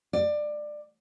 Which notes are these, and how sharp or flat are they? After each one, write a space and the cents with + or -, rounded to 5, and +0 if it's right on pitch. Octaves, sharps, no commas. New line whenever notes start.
D5 +20